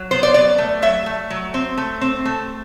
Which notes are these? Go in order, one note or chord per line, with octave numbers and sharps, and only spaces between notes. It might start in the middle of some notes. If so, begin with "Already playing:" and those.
Already playing: F#3
B3 C5
D5
F#3 D5
A3
F#3 E5
A3
F#3
C4
A3
C4
A3